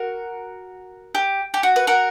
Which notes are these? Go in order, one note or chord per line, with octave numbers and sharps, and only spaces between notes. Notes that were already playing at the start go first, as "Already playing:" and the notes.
Already playing: F#4 A#4
G4
G4
F#4
B4
F#4 A#4